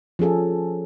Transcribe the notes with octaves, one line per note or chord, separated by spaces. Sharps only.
F3 C#4 G#4 A4